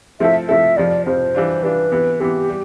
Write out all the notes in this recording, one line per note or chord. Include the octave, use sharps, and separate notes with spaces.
F3 A3 C4 E4 A4 E5
F3 A3 C4 E4 A4 E5
F2 C3 F3 D5
F2 C3 F3 C5
E3 G3 D4 F4
E3 G3 D4 F4 B4
C3 E3 B3
C3 E3 B3 G4
G3